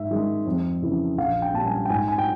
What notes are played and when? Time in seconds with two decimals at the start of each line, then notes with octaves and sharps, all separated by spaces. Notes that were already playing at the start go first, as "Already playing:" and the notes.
Already playing: G#2 E5
0.11 D#3 G#3
0.46 F2
0.82 C#3 E3
1.17 A#1 F5
1.42 G5
1.54 A#2 G3 A5
1.66 G#5
1.85 G5
1.90 G#2 G#5
2.08 G#5
2.18 G5